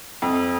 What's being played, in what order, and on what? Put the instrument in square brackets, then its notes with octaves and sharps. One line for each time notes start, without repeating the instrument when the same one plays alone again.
[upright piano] F2